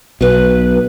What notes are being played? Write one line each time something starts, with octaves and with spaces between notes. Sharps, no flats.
B1 B2 B4